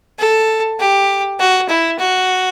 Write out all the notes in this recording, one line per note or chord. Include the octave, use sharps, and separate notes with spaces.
A4
G4
F#4
E4
F#4